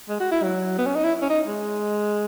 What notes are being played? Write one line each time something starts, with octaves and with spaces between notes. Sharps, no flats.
G#3
F#4
E4
F#3
B3
C#4
D#4
E4
C#4
D#4
G#3